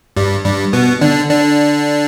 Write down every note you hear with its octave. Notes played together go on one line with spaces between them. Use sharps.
G2 G3
G2 G3
B2 B3
D3 D4
D3 D4